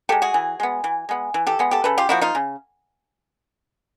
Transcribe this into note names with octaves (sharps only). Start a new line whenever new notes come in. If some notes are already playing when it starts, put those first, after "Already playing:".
G#3 B3 G4 A4
F#4 G#4
E3
G#3 B3
E3
G#3 B3
E3
G4 A4
G#3 B3
G4 A4
C#3 A4 B4
F4 G4
F3 A#3 E4 F#4
D#4 F4
C#3